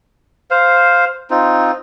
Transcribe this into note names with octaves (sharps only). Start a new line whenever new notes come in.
C5 F5
C4 D#4 F4